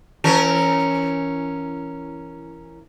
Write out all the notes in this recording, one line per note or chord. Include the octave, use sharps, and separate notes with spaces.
E3 C#4 A#4